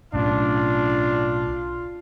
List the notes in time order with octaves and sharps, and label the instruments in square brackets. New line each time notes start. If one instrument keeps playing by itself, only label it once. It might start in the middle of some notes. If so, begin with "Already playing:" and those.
[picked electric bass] B1 A2 C#4 [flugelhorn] D4 [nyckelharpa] F4